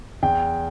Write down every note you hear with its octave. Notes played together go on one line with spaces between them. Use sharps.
E2 G5